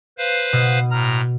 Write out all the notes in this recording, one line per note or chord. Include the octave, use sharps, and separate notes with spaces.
B4 C5 F5
B2
A2 A#5 F6